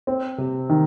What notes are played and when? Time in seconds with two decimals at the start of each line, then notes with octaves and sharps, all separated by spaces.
0.07 C4
0.38 C3
0.70 D#3